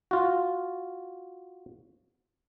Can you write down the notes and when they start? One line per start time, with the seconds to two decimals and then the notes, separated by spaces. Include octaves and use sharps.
0.11 F4 F#4